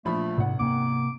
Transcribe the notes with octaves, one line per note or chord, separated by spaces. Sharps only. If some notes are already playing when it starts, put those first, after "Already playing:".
A#1 F3 A3 B5
G#1 G#2 C3 F#5
C3 A#3 B3 D6